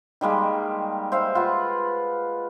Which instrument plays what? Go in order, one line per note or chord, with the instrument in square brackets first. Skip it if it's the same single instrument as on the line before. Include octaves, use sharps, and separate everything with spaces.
[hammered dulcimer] D#3 G3 G#3 A#3
C5 E5 F5
F4 B4 F#5